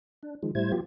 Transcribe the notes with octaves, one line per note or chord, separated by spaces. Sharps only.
D4
D#3 F3 G#3
A2 G3 E4 C5 G#6
F3 F#3 B3 F4 G4